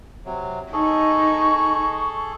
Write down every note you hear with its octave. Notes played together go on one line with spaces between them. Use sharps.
C3 F#3
D#4 G#4 A4 C#6